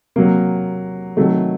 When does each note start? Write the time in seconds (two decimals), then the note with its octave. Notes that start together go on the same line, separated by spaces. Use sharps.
0.16 C3 F#3 A#3
1.17 C3 D#3 F#3 A3